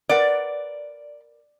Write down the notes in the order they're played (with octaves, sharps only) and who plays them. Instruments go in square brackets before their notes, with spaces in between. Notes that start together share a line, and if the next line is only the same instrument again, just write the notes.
[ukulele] A#4 B4 F#5 [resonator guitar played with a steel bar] D5